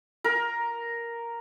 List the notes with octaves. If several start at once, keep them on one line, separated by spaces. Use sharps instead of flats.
A#4